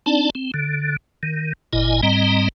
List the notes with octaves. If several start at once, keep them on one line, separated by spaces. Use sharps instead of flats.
C4 D4 D#4 D5 A5
C4
D3
D#3
G1 A#2 E4 D#5 G#5
G#2 G3 C4 D#5 A#5